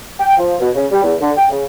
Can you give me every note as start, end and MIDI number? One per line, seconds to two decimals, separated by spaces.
0.20 0.35 79
0.37 0.55 53
0.60 0.69 47
0.75 0.85 49
0.92 1.03 55
1.03 1.14 40
1.21 1.31 50
1.37 1.46 79
1.50 1.62 49